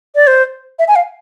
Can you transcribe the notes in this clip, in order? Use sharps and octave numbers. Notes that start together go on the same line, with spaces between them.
D5
C5
E5
G#5
F5